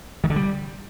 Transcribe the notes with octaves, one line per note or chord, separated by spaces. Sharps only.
D#3
D3
G3